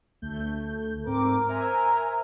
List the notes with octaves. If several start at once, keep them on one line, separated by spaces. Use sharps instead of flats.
D2 A3 G6
G#2 C4 A#4 D6
C5 E5 G#5 A#5